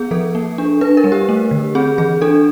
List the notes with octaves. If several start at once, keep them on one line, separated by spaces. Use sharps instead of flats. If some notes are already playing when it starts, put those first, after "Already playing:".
Already playing: B3 G#4
F3 A4
A#3
D4
D4 B4
A#4
G3
G4
A3
D3
C4 G#4
E3 G#4
D4 A4